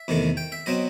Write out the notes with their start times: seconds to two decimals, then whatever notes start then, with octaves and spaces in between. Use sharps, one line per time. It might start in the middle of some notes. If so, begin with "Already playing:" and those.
Already playing: E5
0.08 E2 C3 D#3 A3
0.37 G5
0.52 E5
0.66 B2 F#3 C4 D#5